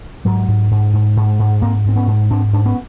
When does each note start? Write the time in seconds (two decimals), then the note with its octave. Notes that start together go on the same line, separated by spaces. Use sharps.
0.25 G#2 F#3 G#3
0.48 G#2
0.71 G#2
0.93 G#2
1.17 G#2
1.39 G#2
1.62 G#2 A#3 C4
1.85 G#2 C4
1.96 B3 C#4
2.07 G#2
2.30 G#2 C4 D4
2.53 G#2 D4
2.66 B3 C#4